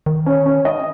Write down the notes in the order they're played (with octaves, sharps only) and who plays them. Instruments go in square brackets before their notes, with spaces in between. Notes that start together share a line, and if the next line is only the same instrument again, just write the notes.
[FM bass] D#3
[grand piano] C#4
C#4
D#5